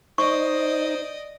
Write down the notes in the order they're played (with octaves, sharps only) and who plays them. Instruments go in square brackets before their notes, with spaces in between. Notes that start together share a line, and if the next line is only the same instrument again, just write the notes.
[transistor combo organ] D#4 [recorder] C5 [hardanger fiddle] D5 D#5 [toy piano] C#6